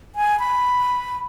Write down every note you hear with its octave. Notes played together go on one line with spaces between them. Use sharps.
G#5
B5